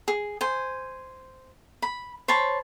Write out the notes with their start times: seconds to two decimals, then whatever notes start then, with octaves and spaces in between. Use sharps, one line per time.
0.08 G#4
0.41 C5 G#5
1.82 B5
2.28 C5 C#5 A5 B5